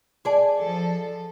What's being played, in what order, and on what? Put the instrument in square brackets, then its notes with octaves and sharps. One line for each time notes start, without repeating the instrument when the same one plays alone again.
[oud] G#4 D5 [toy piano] D#5 A5 C6
[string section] F3 A4